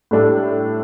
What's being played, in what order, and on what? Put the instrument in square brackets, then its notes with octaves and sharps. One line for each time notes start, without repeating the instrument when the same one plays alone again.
[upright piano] A2 G3 D4 A4